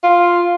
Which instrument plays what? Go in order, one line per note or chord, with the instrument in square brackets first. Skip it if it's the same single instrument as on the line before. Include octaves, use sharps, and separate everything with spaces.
[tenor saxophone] F4